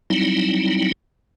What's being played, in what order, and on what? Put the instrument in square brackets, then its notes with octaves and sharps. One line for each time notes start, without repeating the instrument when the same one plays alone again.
[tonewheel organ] F#3 G3 C4 D#4 E4